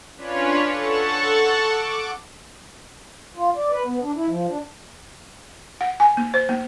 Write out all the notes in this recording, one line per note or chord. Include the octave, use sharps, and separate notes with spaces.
C#4 D4 F4 B4 C#5
A4 F#5 A5 C#6
D6
F4
D5
B4
B3
D4
E4
F3
D4
F#5
G#5
A#3
C5
A#3